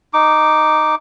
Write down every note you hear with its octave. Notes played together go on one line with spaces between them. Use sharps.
D#4 D6